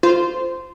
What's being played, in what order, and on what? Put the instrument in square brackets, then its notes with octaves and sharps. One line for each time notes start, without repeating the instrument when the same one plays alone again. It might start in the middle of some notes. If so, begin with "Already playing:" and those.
[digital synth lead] F4 [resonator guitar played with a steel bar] C5